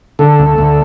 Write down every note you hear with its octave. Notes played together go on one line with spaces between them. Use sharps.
D3 A4
D2
D2